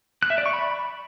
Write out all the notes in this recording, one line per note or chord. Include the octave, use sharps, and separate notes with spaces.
F#6
E5
D5
C#6
B5